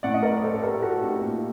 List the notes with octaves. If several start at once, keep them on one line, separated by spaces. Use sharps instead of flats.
A2 D5 F#5
D#5
A#4 D5
A4 C5
G4 A#4
F#4 A4
D#4 G4
A#2